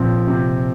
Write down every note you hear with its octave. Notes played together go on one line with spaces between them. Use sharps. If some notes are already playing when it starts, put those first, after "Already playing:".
Already playing: A#2 F3 C4
C3